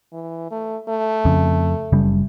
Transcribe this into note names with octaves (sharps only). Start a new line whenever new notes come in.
E3
A3
A3
F2 C#3
F#1 C#3 G3